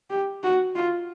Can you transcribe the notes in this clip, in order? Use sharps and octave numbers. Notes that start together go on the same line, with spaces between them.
G4
F#4
F4